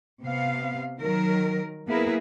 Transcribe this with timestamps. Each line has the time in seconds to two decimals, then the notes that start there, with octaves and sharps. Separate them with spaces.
0.22 C3 B3 F5
0.98 D#3 F#3 A#4
1.87 A#3 B3 E4 G#4 A#4 B4